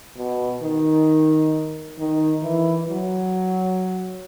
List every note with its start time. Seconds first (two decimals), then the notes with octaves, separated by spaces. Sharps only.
0.17 B2
0.63 D#3
1.99 D#3
2.43 E3
2.89 F#3